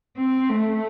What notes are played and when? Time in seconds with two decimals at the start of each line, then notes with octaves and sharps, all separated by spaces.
0.17 C4
0.49 A3